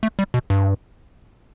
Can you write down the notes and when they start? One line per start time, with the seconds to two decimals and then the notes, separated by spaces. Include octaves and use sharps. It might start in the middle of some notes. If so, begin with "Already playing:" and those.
0.03 A3
0.19 G3
0.34 B2
0.50 G2